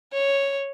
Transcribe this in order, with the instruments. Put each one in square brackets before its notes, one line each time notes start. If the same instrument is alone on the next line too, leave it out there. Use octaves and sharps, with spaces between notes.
[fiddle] C#5